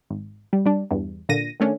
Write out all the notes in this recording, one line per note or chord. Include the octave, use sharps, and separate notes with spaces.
G#1
G3
G3 D4
E2 G2
A#2 D3 A#6 D#7
D#3 A3 C#4 D4